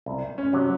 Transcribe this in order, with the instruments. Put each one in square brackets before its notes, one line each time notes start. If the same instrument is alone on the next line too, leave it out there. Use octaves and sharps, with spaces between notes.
[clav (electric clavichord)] C2
[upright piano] C#4
[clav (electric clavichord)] C3 F#3